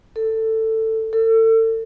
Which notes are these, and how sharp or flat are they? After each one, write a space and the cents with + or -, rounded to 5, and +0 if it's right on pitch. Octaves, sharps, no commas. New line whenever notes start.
A4 +15
A4 +35